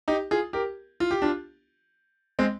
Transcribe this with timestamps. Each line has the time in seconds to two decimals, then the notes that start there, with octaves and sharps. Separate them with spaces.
0.08 D#4 G4
0.31 F4 G#4
0.53 G4 A#4
1.00 F4
1.11 G4
1.22 D4 F4
2.39 G#3 C4